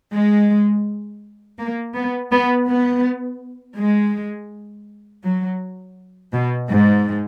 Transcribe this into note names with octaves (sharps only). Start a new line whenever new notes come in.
G#3
A#3
B3
B3
B3
G#3
F#3
B2
G#2